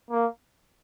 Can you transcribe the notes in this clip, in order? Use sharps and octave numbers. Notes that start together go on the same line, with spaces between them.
A#3